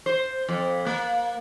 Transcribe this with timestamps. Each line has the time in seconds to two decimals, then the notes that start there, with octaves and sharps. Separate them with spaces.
0.06 C5
0.49 F2
0.86 A#3